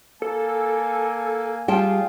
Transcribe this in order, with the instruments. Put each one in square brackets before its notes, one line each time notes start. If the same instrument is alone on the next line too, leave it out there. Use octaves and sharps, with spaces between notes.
[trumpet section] A#3 G#5 [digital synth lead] A4
[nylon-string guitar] G3 G5 A5 [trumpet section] F4 G#4